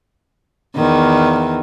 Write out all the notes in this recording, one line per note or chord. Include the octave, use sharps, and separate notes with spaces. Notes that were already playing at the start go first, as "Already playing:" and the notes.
E2 D#3